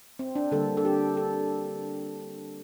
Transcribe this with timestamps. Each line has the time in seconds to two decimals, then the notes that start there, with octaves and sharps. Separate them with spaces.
0.19 C4
0.35 D4
0.52 D3 G3 A#3 A4
0.77 A4
0.85 G4
1.17 A4